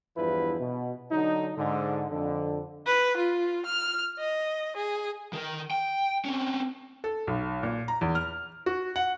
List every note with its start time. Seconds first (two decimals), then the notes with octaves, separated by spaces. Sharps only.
0.17 E2 G2 F3 E4 B4
0.60 B2
1.11 D3 F#3 D#4
1.58 G#2 D3
2.10 F2 D3
2.86 B4
3.17 F4
3.66 F6
4.19 D#5
4.77 G#4
5.33 D#3 A#4
5.71 G5
6.25 C4 C#4
7.04 A4
7.27 B1
7.63 A#2
7.88 A#5
8.01 E2
8.15 F6
8.66 F#4
8.96 F#5